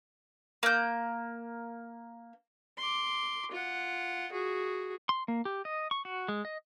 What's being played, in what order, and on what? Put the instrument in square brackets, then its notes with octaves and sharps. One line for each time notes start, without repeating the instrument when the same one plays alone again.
[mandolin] A#3 G6
[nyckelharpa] C6 D6
F4 F#5
F#4 G#4
[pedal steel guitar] C6
A#3
G4
D#5
C#6
F#4
G#3
D#5